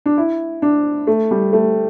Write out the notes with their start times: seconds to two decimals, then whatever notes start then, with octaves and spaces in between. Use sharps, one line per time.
0.06 D4
0.17 E4
0.62 D4
1.07 A3
1.31 G3
1.53 A3